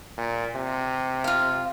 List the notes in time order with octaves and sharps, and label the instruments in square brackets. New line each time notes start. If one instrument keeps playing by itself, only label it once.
[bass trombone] A#2
C3
[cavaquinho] F4 F5